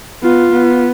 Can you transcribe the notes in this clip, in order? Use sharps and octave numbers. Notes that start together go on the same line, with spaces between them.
B3 F4
B3